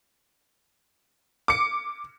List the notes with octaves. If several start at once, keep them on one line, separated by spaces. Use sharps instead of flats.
D6 C#7